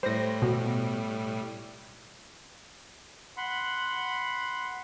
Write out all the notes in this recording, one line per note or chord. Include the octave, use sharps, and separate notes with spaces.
A2 G3 C5 A#6
B2
F#5 B5 C6